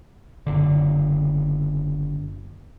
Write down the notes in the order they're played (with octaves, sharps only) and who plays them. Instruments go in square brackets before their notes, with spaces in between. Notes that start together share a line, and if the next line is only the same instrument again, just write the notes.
[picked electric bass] F#1 D3